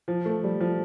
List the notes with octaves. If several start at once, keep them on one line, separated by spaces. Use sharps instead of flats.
F3
A3
G3
F3